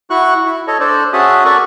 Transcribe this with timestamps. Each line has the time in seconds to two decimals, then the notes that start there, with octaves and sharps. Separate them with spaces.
0.10 E4 F#4 C#6 F#6
0.46 E4
0.67 A4 C#5 D#5
0.80 D4 A4 C5 D5
1.13 C#4 F#4 G#4 E5 A5 D#6
1.45 F#4 A4 A#4 D5 F#5 C#6